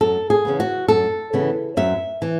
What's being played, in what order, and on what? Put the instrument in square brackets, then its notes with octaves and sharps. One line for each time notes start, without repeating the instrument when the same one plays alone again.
[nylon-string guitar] F#2 A4
G#4
C#3 E3 B3
F#4
F#2 A4
C#3 E3 B3
F#2 E5
E3